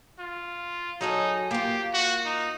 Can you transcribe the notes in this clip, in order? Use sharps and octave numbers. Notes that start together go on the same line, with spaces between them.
F4
F#3 D#4 G#4 A4
A#3 F4 G4
F#4
D#4